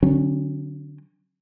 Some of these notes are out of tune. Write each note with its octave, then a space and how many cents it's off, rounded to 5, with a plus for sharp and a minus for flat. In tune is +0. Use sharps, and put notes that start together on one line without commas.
D3 +0 F#3 +0 C#4 -40